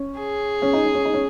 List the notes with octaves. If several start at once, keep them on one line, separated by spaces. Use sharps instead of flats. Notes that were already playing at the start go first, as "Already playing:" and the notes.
Already playing: C#4
G#4
C#4
D#4
C#4
C#4
D#4
C#4